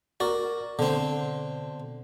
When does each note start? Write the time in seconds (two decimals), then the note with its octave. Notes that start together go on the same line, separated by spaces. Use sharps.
0.20 F#4 A#4 D5
0.79 B2 D3 C4